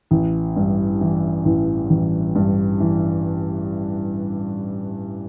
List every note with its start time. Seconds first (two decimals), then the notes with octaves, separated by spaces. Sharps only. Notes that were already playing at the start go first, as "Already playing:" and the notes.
0.11 A1
0.56 G2
1.01 E3
1.45 A1
1.90 A1
2.35 G2
2.80 E3